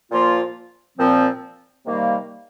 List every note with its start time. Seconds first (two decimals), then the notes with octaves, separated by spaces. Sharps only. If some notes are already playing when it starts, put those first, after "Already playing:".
0.10 A#2 F3 A#3 F4
0.98 A#2 F3 C4
1.86 C3 D#3 G3 A#3